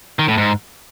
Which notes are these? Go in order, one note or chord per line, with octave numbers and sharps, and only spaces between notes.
D#3
A2
G#2